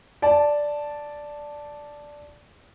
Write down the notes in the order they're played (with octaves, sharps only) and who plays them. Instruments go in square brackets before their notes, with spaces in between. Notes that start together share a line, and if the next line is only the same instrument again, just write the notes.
[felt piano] D5 A5